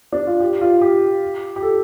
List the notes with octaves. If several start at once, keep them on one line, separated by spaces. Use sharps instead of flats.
D4
F4
G4
F4
G4
G4
A4